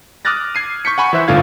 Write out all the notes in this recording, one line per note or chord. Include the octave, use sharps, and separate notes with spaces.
D6 D#6 F6 F#6 A6 A#6
G#6 C7 D#7
C#6 G6 B6 C#7
F#5 G#5 B5 C#6
E3 E4 C5 E5 F#6
G1 A2 D3 F4 F5 G#6